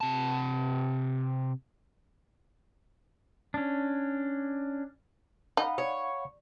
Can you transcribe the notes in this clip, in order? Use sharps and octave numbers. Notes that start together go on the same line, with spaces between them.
C3 A5
C#4 D4
D#4 F5 F#5 B5
C#5